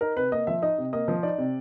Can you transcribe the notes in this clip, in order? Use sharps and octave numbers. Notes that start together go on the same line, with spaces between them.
D#4 A#4
C3 B4
A#3 D#5
F3 E5
D#4 D#5
C3
A#3 D#5
F3
D#4 D5
C3